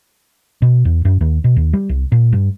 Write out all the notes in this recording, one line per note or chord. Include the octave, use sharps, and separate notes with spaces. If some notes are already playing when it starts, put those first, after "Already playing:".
B2
E2
F#2
D#2
B2
D#2
G3
C2
A#2
G2